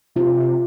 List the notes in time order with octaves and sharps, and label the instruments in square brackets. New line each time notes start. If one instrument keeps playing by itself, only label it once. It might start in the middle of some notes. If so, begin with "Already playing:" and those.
[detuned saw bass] C3 [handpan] F4